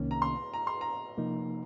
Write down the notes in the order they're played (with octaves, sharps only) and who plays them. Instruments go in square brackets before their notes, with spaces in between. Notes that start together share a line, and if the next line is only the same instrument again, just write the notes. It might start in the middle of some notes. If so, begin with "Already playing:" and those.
Already playing: [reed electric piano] C2 C3 D#3 A#3 C#4
[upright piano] A#5
C6
A#5
C6
A#5
[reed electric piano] C3 F3 A#3 D#4